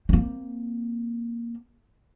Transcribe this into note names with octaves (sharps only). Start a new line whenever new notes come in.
A#3 C4